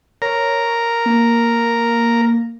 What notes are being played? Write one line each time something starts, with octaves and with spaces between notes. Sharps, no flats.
A#4 C#5
A#3